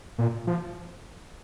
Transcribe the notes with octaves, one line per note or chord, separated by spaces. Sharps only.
A#2
F3